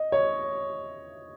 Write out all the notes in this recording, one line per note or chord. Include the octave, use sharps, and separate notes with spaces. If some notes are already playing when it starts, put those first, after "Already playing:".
Already playing: D#5
C#5